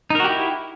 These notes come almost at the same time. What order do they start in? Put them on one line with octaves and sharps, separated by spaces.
D#4 A#4 F#4 G4 E4